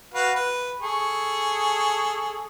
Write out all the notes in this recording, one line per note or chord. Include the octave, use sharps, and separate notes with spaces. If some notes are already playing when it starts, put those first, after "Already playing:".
F#4 B4 F5
B4
G#4 A4 C#6